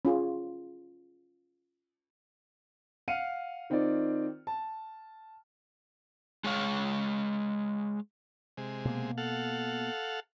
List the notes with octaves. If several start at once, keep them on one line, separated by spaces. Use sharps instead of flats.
C#4 F4 G#4
F5 F#5 F6 C#7 D#7
D#3 C4 D#4 F4 D5
A5
G#3 C#5 F5
C3 G#3
B2 A#3
A4 F5 F#5